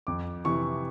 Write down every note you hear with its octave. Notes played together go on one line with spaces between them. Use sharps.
F2 D6
C3 E3 C#6